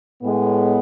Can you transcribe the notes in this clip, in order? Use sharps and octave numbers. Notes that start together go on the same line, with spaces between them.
A2 G#3 B3